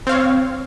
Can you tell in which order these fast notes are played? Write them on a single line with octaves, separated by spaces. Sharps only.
C4 F5 C#5